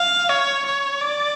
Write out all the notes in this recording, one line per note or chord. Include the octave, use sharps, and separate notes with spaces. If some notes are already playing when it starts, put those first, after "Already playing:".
Already playing: F5
C#5
C#5
D5